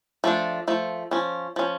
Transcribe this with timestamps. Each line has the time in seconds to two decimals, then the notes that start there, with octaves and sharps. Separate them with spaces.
0.24 F3 A3 D4
0.68 F3 A3
1.11 F3 C#4
1.56 F3 C#4